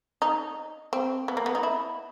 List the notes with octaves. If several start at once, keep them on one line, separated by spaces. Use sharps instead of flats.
D#4
C4
B3
A#3
B3
D#4
E4